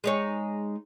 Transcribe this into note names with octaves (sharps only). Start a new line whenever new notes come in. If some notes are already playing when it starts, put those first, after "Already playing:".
G#3 D#4 C#5